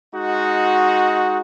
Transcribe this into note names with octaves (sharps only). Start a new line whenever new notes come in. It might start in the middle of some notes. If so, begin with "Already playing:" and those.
G#3 D#4 F#4